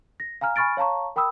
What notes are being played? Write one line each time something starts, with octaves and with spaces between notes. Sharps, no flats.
A#6
F5 G#5 A#5 F6
G#5 B5 C#6 F6 A6 D7
C#5 F5 A5 A#5 C#6
A#4 G5 B5 D#6 E6